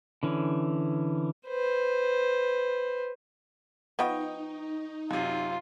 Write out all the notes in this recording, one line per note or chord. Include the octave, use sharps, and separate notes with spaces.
D3 E3 C#4
B4 C5
F3 B3 D#4 D#5 G5 C#6
F#2 C3 F4